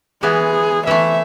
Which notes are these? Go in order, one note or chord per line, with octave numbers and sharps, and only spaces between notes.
E3 G#3 B3 G#4
E3 A3 E5